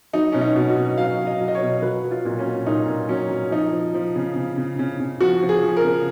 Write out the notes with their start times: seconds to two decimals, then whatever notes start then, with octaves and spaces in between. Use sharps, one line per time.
0.13 F#3 D#4
0.32 B2 C#4
0.41 D#4
0.56 B2
0.70 F#4
0.76 B2
0.98 F#3 F5
1.20 B2
1.27 D#5
1.41 F#3
1.48 D#5
1.55 C#5
1.62 B2
1.82 F#3 B4
2.04 F#3
2.11 F4
2.25 A#2
2.39 C#4
2.45 F#3
2.66 A#2 D#4
2.88 A#2
3.09 F#3 C#4
3.30 F#3
3.51 F3 D#4
3.72 F3
3.95 F3
4.16 C#3
4.36 C#3
4.58 C#3
4.79 C#3
5.00 C#3
5.21 F3 F#4
5.43 F3
5.49 G#4
5.63 F3
5.77 A#4
5.84 C#3